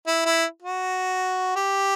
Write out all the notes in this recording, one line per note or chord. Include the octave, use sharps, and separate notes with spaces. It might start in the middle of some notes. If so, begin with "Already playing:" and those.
E4
E4
F#4
G4